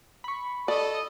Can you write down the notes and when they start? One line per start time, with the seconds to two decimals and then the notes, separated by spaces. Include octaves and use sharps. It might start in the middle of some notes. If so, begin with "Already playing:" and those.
0.24 B5 C#6
0.68 A4 D5 D#5